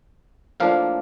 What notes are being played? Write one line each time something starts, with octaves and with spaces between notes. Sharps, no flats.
A2 F3 A#3 D4 F5